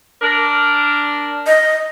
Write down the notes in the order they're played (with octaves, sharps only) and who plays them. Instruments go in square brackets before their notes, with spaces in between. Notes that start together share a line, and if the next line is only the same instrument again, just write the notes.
[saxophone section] D4 A#4
[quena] D#5